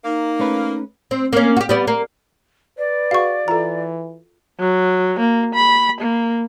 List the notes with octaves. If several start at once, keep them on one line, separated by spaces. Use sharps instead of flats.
A#3 D#4
A3 C#4 B4
C4
A#3 C#4
F#4 G4
G3 B3 D5
A#3
B4 D5
F#4 G#4 F5 F#5 C#6
E3 F4 A4 A#5
F#3
A#3
B5
A#3